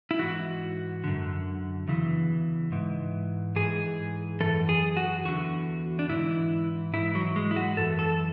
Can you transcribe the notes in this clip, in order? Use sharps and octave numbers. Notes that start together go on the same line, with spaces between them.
E4
G#2 E3 F#4
F#2 D3
E2 C#3 E3
G#2 E3
G#2 E3 G#4
F#2 E3 A4
G#4
F#4
E2 D3 F#4
D4
G#2 E3 E4
G#2 E3 E4
F#3
G#3
E4
F#4
F#2 E3 A4
A4